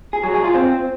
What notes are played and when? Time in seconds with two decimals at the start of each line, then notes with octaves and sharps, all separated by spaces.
0.13 G#4
0.23 F#3
0.34 G#4
0.44 F4
0.54 C4